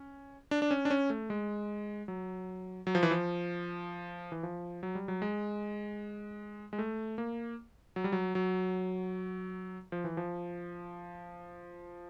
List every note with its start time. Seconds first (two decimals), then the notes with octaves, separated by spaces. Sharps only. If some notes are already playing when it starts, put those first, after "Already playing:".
Already playing: C#4
0.51 D4
0.62 D4
0.71 C#4
0.85 D4
0.90 C#4
1.10 A3
1.30 G#3
2.08 F#3
2.87 F#3
2.95 F3
3.03 E3
3.11 F3
4.32 E3
4.43 F3
4.83 F#3
4.95 G3
5.08 F#3
5.22 G#3
6.73 G#3
6.79 A3
7.18 A#3
7.96 F#3
8.04 G3
8.12 F#3
8.35 F#3
9.92 F3
10.04 E3
10.17 F3